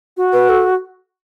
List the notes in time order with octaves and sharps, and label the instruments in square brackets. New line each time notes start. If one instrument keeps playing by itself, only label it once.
[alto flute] F#4
[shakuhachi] B4
A4